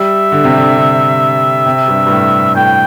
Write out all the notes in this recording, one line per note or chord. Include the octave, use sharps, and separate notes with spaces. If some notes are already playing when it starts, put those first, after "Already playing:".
Already playing: G3 E5
D3
C3
D3
D3
C3
G2
G2
A2
A2 G5